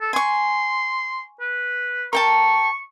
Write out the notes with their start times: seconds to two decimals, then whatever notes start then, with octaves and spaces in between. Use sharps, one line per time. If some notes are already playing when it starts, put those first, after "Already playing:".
0.01 A4
0.13 G#5 C6 C#6
1.40 B4
2.13 A#4 G5 A5 C#6